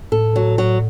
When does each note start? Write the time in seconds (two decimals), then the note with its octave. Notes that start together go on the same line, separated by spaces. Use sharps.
0.12 A2 A4
0.36 F#3
0.58 F#3